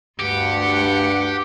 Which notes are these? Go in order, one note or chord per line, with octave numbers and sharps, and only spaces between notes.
D2 G2 G4 F#5